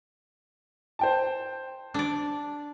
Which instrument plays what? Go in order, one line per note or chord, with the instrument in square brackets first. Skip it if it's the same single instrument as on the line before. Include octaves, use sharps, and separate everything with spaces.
[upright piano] C5 G5 A5
[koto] D4 D5